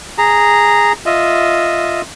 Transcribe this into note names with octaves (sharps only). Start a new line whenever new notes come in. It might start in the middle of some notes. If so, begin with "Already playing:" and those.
G#4 A#5
F4 D#5 E5